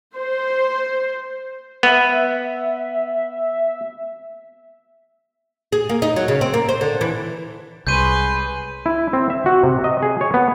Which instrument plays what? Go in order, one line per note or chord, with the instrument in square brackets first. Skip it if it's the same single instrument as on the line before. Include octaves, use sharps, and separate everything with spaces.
[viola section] C5
[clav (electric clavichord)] B3 [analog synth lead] E5
[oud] G#4
A#3
D#4
F#3
C#3
C4
A#3
C5
D3
E3
[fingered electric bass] C2 [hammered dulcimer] G#3 G#4 C#5 [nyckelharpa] B4 C6 [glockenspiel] G6 D#7
[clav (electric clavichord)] E4
C4
E5
F#4
C3
D#5
G#4
C#5
B3